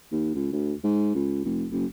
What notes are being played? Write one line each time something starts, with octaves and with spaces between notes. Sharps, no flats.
D#2
C#2
D2
G#2
C#2
F1
F#1